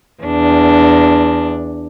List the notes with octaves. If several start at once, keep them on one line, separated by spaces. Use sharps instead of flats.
E2 D4